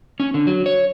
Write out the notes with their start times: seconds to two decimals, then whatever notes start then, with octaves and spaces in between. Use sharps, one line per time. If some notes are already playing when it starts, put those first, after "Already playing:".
0.20 C#4
0.34 D3
0.47 F#3
0.66 C#5